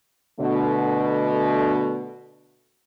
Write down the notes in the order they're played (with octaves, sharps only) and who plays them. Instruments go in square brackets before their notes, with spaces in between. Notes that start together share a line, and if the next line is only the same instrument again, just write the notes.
[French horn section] B2 D3 A3